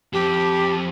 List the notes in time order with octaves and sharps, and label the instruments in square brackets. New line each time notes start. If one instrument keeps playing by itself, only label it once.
[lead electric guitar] F2 [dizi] G4